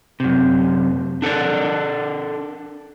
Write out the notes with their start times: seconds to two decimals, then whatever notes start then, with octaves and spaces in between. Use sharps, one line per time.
0.20 F#2 C3
1.22 D4 A4 A#4 D5